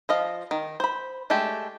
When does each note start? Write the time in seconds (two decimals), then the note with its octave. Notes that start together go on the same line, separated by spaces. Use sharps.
0.09 F3 D#5 F5
0.51 D#3
0.80 C5 B5
1.30 G#3 A3 D4 G4